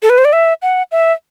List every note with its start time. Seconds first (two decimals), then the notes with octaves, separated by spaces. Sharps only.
0.03 A4
0.10 B4
0.18 C5
0.25 D5
0.33 E5
0.62 F#5
0.92 E5